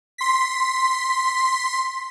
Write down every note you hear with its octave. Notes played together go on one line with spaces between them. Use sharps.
C6 B6